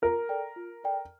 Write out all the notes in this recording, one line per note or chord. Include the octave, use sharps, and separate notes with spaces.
F4 A#4
A4 D5 G5
F4
A4 D5 G5